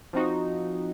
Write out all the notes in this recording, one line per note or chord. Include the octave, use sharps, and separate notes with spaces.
F3 C4 D#4 F#4